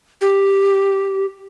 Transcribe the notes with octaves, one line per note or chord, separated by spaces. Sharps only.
G4